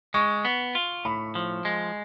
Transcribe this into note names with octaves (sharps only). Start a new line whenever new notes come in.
G#3 C#6
B3
F4
A2 B5
F3
G#3